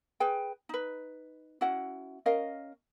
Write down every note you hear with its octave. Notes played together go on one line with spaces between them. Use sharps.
G#4 B4 G5
D#4 B4
C#4 E4 F#4 F#5
C#4 A#4 D#5 F5